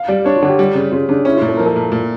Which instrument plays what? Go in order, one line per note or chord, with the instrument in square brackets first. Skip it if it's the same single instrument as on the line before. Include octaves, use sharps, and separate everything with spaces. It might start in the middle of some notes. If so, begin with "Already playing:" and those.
Already playing: [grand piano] F5
[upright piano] G3 [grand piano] D5
[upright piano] D4 [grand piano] C#5
[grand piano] F4
[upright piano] D3
[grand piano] G4
[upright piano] G3
C#3
[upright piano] C#3 [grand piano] F4
[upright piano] C#3 [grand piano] D4
[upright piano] C#4 [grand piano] E4
[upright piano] A#2 [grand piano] F4
[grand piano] A4
[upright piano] F3 [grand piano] A#4
[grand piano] A4
[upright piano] A#2
A#2